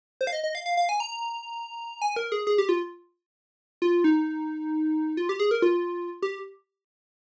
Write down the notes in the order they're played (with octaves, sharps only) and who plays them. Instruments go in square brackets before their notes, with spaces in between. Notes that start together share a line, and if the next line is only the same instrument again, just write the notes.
[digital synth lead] C5
F5
D#5
D#5
F5
F5
F5
G#5
A#5
G#5
A#4
G#4
G#4
G4
F4
F4
D#4
F4
G4
G#4
A#4
F4
G4